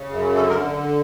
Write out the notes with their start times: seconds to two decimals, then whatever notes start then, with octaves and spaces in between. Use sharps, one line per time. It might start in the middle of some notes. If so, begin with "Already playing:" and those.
Already playing: C#3
0.10 F#2
0.35 D3 A4
0.49 A#4